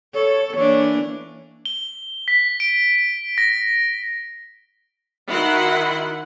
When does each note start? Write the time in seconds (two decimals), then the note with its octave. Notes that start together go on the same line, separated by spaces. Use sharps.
0.14 A4 C#5
0.55 E3 A#3 D4 C#5
1.65 G7
2.28 B6
2.60 D7
3.38 A#6
5.30 D#3 E4 F#4 F#5 C6